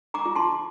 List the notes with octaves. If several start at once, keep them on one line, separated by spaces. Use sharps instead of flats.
A#5 D6
F4
A5 C6